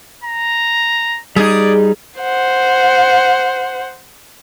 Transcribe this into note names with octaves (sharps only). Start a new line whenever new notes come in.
A#5
G3 D#4 G#4 D5
C5 F#5